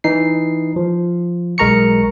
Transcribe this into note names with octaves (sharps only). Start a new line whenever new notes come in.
E3 D#4 C7
F3
B1 G#3 A#4 A#5 C#6 C#7